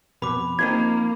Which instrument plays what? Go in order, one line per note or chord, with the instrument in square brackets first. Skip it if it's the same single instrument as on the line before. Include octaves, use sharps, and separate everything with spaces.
[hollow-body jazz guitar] F2 B2 B4 [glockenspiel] B5 D6
[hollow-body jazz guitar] F3 C4 D#4 [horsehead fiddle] A#3 [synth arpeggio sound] G#6